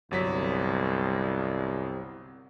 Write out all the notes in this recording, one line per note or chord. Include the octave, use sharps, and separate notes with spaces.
G1 C2 F#3 B6